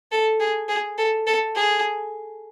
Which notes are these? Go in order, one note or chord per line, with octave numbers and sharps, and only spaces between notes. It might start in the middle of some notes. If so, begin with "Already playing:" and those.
A4
G#4
G#4
A4
A4
G#4